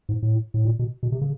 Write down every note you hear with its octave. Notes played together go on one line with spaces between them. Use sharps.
G#2
A2
A2
A#2
B2
B2
C3
C#3